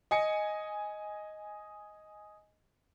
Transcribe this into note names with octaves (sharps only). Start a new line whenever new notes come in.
D#5 G#5 C#7